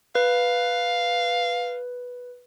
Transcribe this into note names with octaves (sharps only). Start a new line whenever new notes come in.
B4 F5